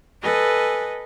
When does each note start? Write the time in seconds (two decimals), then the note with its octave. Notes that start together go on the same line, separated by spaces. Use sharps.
0.22 A4 B4 D#5 G#5